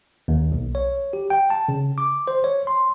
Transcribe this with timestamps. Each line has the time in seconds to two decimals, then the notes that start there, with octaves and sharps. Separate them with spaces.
0.28 D#2
0.52 B1
0.75 C#5
1.13 G4
1.30 G5
1.50 A5
1.68 C#3
1.98 D6
2.28 C5
2.44 C#5
2.67 C6